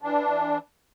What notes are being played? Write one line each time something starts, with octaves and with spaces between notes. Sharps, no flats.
E3 D4